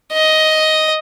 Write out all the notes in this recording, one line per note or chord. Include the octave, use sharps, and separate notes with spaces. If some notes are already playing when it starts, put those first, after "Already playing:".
D#5